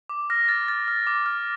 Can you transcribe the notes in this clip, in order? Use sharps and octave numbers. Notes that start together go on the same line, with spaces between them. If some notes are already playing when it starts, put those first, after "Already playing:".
D6
F6 A#6
F6 A6
F6 A6
F6
D6
F6